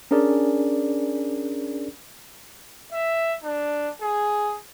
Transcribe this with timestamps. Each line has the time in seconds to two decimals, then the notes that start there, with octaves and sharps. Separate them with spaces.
0.11 C#4 D4 G#4 A#4 D5
2.92 E5
3.44 D4
4.02 G#4